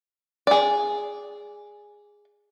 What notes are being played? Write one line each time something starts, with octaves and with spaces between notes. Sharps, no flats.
G#4 D5